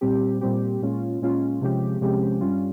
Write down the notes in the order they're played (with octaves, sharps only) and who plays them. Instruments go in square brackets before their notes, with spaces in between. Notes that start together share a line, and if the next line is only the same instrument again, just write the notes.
[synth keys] A#2 G3 C4 G4
A#2 G3 C4 G4
A#2 G#3 C#4 F4
A#2 G#3 C#4 F4
C3 F3 G#3 C#4 G4
C3 F3 G#3 C#4 G4
G2 G3 C#4 F4